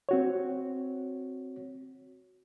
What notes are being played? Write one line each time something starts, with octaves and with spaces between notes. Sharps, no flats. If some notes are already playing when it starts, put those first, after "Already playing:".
C4 F#4 C#5